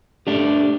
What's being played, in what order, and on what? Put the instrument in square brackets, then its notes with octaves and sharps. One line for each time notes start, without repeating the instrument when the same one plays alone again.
[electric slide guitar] A3 D4 G4